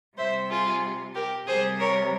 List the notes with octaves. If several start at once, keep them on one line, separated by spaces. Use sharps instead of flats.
C3 G3 C5 E5
F4 G#4
G4 A#4
C3 G3 G#4 C5
A#4 C#5